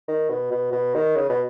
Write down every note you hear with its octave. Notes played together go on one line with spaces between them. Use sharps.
D#3
B2
B2
B2
D#3
C#3
B2